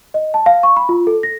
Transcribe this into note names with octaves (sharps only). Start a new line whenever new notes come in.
D#5
A5
F5
C#6
B5
F4
A4
A#6